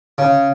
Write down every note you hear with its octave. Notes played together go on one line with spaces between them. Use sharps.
C#3